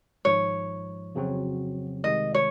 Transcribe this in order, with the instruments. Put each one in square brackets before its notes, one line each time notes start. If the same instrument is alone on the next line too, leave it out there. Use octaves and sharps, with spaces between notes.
[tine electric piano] G#1 G#2 F3 [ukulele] C#5
[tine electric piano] F2 C#3 F#3 C4 F#4
[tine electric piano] C2 C3 D#3 G#3 [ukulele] D#5
[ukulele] C#5